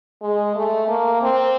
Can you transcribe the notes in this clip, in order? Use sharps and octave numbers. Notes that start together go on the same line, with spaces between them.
G#3
A3
A#3
C4